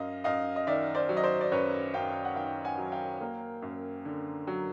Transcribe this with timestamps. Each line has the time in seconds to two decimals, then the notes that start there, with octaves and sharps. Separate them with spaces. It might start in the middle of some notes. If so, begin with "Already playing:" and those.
Already playing: F#2 D#5 F5
0.24 F#2 D#5 F5
0.56 D#5
0.67 D#3 D5 E5
0.95 C5 D5
1.09 F#3
1.17 D#5
1.23 C5 D5
1.41 D5
1.52 F#2 B4 C#5
1.94 F#2 F5 G5
2.25 F#5
2.36 D#3 F5 G5
2.65 F#5 G#5
2.78 F#3
2.92 F5 G5
3.21 A#3
3.62 F#2
4.05 D3
4.47 F#3